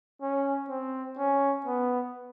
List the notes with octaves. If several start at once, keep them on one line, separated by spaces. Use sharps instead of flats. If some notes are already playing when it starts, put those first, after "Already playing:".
C#4
C4
C#4
B3